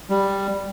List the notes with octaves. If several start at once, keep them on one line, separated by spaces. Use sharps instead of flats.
G3